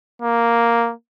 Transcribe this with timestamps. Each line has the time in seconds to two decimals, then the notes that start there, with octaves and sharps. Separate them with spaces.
0.22 A#3